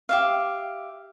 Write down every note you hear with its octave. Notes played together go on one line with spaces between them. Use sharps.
G4 E5 F5